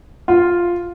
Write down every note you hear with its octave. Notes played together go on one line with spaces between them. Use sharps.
F4